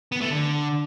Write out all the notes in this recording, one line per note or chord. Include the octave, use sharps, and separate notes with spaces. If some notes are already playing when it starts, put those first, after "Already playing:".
B3
A3
D3